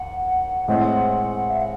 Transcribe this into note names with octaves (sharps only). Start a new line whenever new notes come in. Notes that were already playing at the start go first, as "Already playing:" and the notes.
Already playing: D#2 F#5
A2 G#3 C4 F#5
E5
F#5